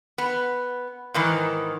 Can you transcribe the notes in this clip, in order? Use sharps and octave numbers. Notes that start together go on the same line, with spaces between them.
B3
G#2 D#3 E3